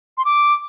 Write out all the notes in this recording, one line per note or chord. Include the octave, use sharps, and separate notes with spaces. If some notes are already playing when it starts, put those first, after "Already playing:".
C6
D6